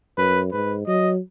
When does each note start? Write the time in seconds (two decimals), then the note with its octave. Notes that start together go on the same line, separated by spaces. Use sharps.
0.17 F#2 B4
0.52 G#2 B4
0.87 F#3 D#5